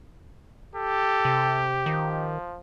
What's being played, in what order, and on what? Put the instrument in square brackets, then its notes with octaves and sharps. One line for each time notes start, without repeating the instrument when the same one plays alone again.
[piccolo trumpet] G4 [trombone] A4
[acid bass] C3
[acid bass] D#3 [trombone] F3